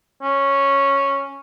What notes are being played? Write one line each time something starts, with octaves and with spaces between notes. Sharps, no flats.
C#4